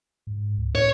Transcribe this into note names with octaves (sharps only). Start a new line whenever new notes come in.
G#2
C#2
A2 C#5